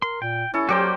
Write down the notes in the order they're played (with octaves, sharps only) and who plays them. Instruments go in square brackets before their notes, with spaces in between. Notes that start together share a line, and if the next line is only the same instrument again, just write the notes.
[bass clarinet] A#4 [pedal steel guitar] C6
[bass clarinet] A#2 [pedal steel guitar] G5
[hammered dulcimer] C#4 A4 [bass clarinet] E4
[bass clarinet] F#3 [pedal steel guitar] F#4 D5 G5 [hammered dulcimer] G4 A#4 C5